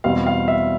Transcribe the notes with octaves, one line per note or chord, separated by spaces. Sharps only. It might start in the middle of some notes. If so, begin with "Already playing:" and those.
E2 B2 G3 C4 F5
F5
E5